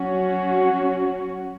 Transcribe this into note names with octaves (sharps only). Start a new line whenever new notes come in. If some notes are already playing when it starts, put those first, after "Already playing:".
Already playing: F#3 C#4 F#4